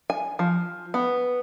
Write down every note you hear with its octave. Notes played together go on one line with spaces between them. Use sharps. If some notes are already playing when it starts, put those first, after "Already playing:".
G#5
F3
B3